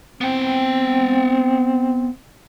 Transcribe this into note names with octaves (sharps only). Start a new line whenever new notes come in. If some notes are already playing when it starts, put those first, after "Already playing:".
B3 C4 G5